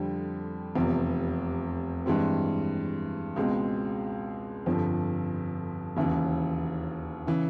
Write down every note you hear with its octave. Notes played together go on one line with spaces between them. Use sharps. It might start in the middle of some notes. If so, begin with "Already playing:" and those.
Already playing: F2 D3 G3 C4
F1 E2 C3
G2 E3 G#3 C4
C#2 B2 G#3 C4
G1 F2 D3 F3
E1 D#2 C#3 E3
C#3 E3